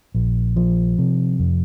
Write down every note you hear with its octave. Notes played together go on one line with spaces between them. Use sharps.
A#1
F3
C3
F2